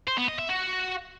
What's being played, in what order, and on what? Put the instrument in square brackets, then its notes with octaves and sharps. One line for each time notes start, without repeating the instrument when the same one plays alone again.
[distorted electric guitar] C5
B3
D#5
E5
F#4